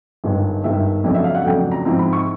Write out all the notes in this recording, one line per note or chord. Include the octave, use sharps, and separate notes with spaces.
G1 G2 D#3 G#3
G1 G2 D#3 G#3 E5
F2 C#3 F#3 A3 D4 D#5
E5
F5
F#5
F2 C#3 F#3 A3 D4 G5
A#5
G#2 F3 G#3 C4 E4
B5
C#6